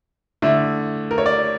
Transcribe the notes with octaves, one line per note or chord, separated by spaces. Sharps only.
D3 A3 E4
A#4
C#5
D5